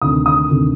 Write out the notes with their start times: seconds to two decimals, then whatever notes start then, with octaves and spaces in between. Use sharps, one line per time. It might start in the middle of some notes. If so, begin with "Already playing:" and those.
0.02 D2 C3 D#3 D#6
0.26 D#6
0.50 D2 C3 D#3